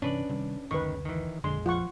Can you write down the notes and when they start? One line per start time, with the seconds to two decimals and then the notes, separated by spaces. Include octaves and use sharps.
0.02 G1 C3 E3 C#4 D4 B4 D5
0.30 C3 D#3 G3
0.71 F#1 D2 D#3 B4 C#6
1.05 D#3 E3
1.44 A#1 F2 D3 G#3 C6
1.66 F3 F4 F#5 C#6